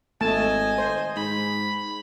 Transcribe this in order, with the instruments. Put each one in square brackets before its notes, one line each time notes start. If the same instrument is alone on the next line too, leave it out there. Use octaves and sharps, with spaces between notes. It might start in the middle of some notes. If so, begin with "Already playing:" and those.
[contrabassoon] G#1 [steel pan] A3 A5 [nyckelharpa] D#5 G#5
[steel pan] C5
[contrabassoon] G#2 [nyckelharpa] B5